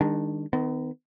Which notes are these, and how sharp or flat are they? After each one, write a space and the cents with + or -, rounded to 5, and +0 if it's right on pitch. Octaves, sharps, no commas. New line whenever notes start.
D#3 +0 G#3 -40 D4 +0
D#3 +0 B3 +45